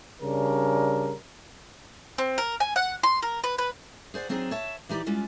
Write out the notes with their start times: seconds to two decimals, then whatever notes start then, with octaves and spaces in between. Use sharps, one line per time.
0.20 C#3 G3 D4 A#4
2.18 C4
2.38 A#4
2.60 G#5
2.76 F#5
3.03 C6
3.22 A#4
3.44 B4
3.58 B4
4.14 G#4 C5 D5 F#5
4.29 F#3 C4 D4 D#4 G#4
4.51 C#5 E5 A5
4.89 E3 D#4 G4 D5
5.06 G3 G#3 C#4 F4